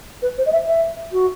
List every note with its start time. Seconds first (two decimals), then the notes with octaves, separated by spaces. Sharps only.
0.22 B4
0.38 C5
0.46 D#5
0.53 E5
0.68 E5
1.12 F#4